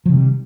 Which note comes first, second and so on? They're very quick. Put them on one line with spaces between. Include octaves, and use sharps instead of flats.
F3 C3 D#3 G3